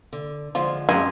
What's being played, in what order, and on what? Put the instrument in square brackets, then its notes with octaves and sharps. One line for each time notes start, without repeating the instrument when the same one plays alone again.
[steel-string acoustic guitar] D3
[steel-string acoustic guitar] D3 F3 G#3 [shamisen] F4
[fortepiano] F#2 [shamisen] C#3 C4 F4 [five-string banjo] G#5